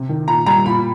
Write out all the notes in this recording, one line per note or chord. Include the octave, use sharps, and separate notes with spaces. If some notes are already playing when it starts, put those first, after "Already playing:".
Already playing: C3
D#3
A#2 A#5
G3 A#5
A#2 B5